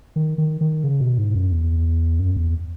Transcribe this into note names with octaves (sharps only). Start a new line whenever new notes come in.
D#3
D#3
D#3
C#3
B2
G#2
F#2
E2
F#2
E2